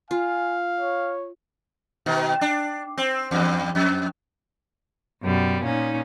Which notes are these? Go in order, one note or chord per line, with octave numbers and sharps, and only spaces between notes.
F4 F5 G#5
C#5
B2 D#3
D4
C4
E2 G2
F2
F#2 B2 G3
A#2 C#4 D#4